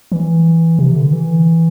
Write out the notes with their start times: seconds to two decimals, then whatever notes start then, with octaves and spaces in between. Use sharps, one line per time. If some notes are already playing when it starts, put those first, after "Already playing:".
0.12 E3
0.79 C3
0.95 D3
1.13 E3